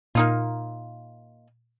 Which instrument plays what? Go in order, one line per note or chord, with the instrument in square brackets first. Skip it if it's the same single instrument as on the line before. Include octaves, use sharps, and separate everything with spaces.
[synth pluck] A#2 [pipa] A#3 D#4 F4